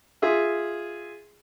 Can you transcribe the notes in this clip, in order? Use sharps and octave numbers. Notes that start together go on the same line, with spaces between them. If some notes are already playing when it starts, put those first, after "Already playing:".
F4 G#4 E5